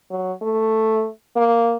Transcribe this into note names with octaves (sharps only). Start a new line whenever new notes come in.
F#3
A3
A#3